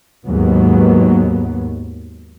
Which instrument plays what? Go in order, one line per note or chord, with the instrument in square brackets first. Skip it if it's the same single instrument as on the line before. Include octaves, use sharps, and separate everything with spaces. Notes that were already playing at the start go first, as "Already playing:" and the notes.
[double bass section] D#2 G#2 F#3 B3